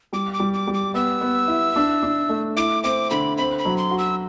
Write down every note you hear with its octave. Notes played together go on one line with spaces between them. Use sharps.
G3 D6
D6
G3
D6
G3
D6
B3 E6
B3
E4
D4
D4
A3
E4 D6
C4 D6
D3 B5
C4 B5
B5
F#3
C6
F#4
E6